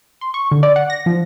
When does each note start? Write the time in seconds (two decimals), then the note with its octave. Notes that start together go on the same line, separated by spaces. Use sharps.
0.21 C6
0.34 C#6
0.52 D3
0.63 D5
0.76 F#5
0.90 A#6
1.06 F3